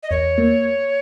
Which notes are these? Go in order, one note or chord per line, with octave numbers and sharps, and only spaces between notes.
D#5
E2 C#5
A#3